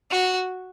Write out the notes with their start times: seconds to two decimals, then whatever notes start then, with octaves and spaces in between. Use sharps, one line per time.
0.11 F#4